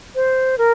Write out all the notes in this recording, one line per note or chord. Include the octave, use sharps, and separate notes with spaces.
C5
A#4